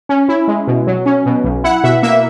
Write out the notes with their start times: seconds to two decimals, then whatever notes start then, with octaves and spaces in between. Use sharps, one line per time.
0.09 C#4
0.29 E4
0.48 G#3
0.67 B2
0.87 F#3
1.06 C#4
1.26 B2
1.44 B1
1.64 E4 F#5
1.84 B2 E5
2.03 A#3 E5